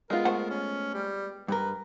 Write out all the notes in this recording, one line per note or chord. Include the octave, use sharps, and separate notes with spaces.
G#3 B3 F4 A#4
A3 C5 F#5
C#4
G3
G2 A#4 B4